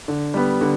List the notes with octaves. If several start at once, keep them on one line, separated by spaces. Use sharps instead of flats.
D3
G3 B3
D3